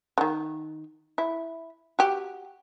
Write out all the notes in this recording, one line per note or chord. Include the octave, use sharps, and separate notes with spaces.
D3 D#3
E4
F#4 G4